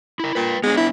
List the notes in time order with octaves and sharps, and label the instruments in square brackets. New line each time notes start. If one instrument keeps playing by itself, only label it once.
[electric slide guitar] E4 A#4
[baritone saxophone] A#2 [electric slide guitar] B4 G5
[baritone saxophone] G#3 [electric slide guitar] B3 D4
[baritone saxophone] E4